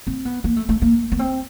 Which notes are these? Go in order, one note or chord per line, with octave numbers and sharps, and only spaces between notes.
C4
B3
A#3
A3
A3
A#3
B3
C4